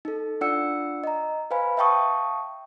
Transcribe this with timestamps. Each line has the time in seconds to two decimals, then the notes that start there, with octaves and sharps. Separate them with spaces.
0.05 D#4 A4
0.41 D4 F4 D5 F#5 E6 C#7
1.04 D#5 A#5
1.51 B4 C5 F5 G#5 B5
1.77 E5 F5 G5 A5 C#6 D#6